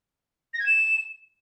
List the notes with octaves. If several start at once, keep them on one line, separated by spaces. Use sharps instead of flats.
A#6
G#6
E7